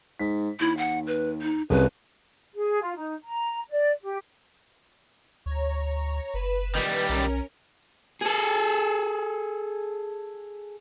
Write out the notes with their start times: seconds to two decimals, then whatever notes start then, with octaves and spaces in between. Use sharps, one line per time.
0.19 G#2 B6
0.60 D#2 E4
0.77 F#5
1.07 B4
1.42 D#4
1.70 C2 C#3 B4
2.55 G#4
2.81 F4
2.97 D#4
3.24 A#5
3.70 D5
4.00 G4
5.46 D2 C#5 A#5
6.34 F#1 B4 E7
6.75 D#3 G3
7.09 B1 C#4 A#4
8.22 G#4 A4